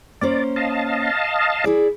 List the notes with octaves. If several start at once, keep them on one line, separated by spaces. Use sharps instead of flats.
A#3 C#4 C5 D5
D#5 F5 A5
E4 G#4 D5